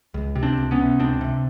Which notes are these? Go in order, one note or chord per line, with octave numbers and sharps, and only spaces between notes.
C#2
C3
C4 D4
C#2
B3 C#4
C3
C#2 C4 D4
C3